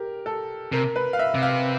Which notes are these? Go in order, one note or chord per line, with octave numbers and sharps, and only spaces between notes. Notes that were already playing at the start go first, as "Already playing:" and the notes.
Already playing: G4 A#4
A4
C3 A#4
B4
F5
E5
C3
F5